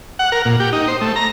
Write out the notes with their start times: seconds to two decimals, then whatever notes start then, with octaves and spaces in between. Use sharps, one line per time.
0.19 F#5
0.32 A#4
0.45 A#2
0.60 G4
0.73 D#4
0.88 C5
1.01 A3
1.16 A#5